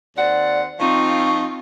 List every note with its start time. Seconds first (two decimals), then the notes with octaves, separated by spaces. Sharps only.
0.16 D#2 C4 D5 F#5
0.79 F3 C4 D#4 F4 C#6